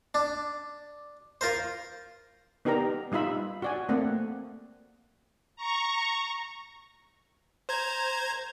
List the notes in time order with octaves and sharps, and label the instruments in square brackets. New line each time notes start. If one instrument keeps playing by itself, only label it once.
[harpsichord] D4
F4 A#4 C5
[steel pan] B3 D#4 G4 A#4 D5 A#5
G3 D#4 F4 E5 B5
F#4 D5 G#5
A3 A#3 C4 D5 F#5
[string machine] A#5 C#6
[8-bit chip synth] C5 A#5 G#6